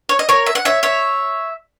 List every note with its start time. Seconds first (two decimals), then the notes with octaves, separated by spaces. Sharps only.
0.09 C#5
0.19 D#5
0.29 A#4 C#5
0.46 E5
0.55 F#5
0.65 C#5 E5
0.83 C#5 E5